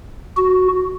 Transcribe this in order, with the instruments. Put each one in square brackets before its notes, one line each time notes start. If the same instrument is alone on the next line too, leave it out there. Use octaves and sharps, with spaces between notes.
[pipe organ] F#4